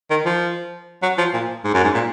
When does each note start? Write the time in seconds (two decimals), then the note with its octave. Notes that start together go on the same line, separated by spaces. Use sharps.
0.10 D#3
0.26 F3
1.03 F#3
1.18 F3
1.33 A#2
1.64 G#2
1.74 F#2
1.84 G#2
1.95 A#2